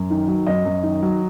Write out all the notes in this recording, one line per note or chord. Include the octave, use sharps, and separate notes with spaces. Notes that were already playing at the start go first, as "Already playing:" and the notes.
Already playing: F#2
D#3
F#3
F#2 D#5
F#2
D#3
F#3